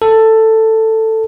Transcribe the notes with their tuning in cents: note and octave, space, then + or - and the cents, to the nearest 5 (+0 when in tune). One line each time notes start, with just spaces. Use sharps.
A4 +10